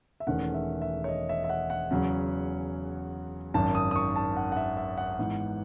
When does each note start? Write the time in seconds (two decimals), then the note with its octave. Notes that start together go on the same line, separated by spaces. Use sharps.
0.20 E5
0.27 E1 E2 D#3 A3 C#4 F#5
0.54 E5
0.82 E5
1.04 C#5
1.08 D#5
1.29 E5
1.44 E5
1.49 F#5
1.70 F#5
1.91 E2 C#3 F#3 C#4
3.54 G#1 F#2 D#3 A5
3.75 D#6
3.91 D#6
3.96 C#6
4.16 A5
4.37 F#5
4.52 F#5
4.57 E5
4.77 E5
4.98 F#5
5.18 G#2 E3 B3